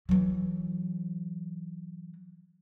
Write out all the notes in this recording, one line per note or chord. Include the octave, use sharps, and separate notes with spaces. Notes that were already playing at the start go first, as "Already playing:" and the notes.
E3 F#3